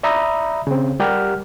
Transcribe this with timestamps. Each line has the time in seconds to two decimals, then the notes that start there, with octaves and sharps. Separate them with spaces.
0.03 D5 E5 A#5 B5 D#6
0.67 C#3 C4
1.00 G3 G4 A#4 F#5 F6